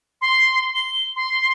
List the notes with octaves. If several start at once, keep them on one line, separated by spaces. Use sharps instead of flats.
C6
G7
C6